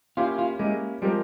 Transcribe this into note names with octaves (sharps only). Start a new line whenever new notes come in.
A#3 C#4 E4 F4 G4
F4
G#3 A#3 C#4 E4 G4
F3 G3 G#3 C4 G4 A#4